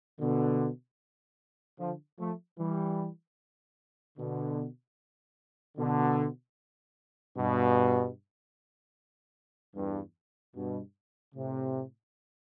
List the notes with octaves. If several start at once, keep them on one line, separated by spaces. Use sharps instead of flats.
B2 D3
D3 F3
F3 A3
E3 G3
B2 D3
B2 D3
G2 B2
E2 G2
G2 B2
A2 C3